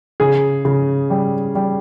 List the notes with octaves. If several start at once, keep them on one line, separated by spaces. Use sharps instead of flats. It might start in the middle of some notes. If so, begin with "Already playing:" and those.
C#3 G#4
C#3
G3
G3